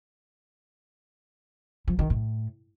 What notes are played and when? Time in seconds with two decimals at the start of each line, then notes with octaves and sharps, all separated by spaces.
1.88 F3
1.99 D#3
2.10 A2